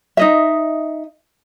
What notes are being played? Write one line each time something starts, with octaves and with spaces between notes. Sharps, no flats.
D#4 D#5 E5